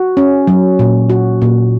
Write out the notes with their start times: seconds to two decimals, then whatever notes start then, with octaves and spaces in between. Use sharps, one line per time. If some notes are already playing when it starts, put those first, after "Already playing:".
Already playing: F#4
0.17 C#4
0.47 F#3
0.79 A#2
1.10 F#4
1.42 A#2